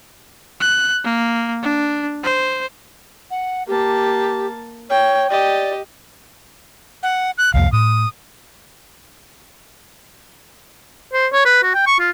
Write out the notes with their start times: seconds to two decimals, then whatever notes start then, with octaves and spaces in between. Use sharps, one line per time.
0.60 F#6
1.04 A#3
1.63 D4
2.24 C5
3.30 F#5
3.68 A#3 G4 A5
4.89 C#5 G5
5.30 G4 D5 D#5
7.03 F#5
7.38 F#6
7.54 C2 F2 A#3 F5
7.72 A2 D#6
11.13 C5
11.33 C#5
11.45 B4
11.63 F#4
11.75 G5
11.87 C#6
12.00 F4